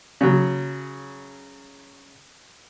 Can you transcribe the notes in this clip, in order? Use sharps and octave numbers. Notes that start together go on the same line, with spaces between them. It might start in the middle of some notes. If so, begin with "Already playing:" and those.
C#3 F#3